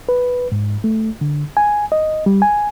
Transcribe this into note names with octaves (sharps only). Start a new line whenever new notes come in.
B4
G#2
A3
D3
G#5
D#5
G3
G#5